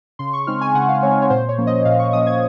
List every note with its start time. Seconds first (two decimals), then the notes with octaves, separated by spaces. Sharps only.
0.19 C#3 C6
0.33 C#6
0.47 G#3 C4 D#4 F6
0.61 G#5
0.75 C#3 F#5
0.88 F5
1.02 G#3 C4 D#4 C#5
1.22 C#5
1.30 A#2 C5
1.49 C#5
1.58 F3 A#3 C#4
1.67 D#5
1.85 A#2 F5
1.99 C#6
2.13 F3 A#3 C#4 D#6
2.27 G#6